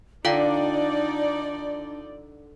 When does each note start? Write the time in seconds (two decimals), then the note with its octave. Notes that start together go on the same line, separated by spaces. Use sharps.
0.25 D3 D4 D#4 F4 D5 F5 G5